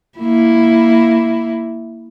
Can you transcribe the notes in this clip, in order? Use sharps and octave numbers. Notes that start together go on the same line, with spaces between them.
A#3 E4